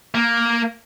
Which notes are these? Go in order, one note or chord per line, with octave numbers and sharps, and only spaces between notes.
A#3